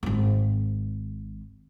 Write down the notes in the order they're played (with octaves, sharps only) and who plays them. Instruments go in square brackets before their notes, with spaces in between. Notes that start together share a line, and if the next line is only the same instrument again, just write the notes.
[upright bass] D1 G#1